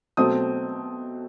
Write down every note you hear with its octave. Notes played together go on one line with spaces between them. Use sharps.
B2 F#3 A3 C4 D#6